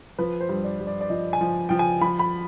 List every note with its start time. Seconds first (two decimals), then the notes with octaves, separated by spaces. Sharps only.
0.19 F3 B4
0.41 C5
0.49 G2
0.64 D5
0.79 G2
0.87 D5
1.01 D5
1.10 F3 D#5
1.33 G#5
1.41 F3
1.69 F3 G5
1.79 G#5
2.01 F3 B5
2.19 B5